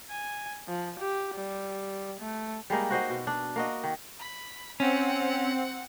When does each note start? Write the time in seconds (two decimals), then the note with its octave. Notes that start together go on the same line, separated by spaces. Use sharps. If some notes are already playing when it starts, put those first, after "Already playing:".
0.11 G#5
0.68 F3
0.99 G4
1.36 G3
2.21 A3
2.70 G3 G#3 A#3 D#4
2.90 F#4 C5 D#5 F#5
3.10 B2
3.27 D4
3.56 A#3 F#4 D#5
3.83 D#3
4.19 B5
4.80 C4 C#4 F#5